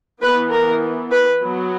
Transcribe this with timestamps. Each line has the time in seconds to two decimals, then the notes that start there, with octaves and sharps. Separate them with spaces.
0.22 E3 B3 B4
0.52 A#4
1.11 B4
1.42 F#3 B3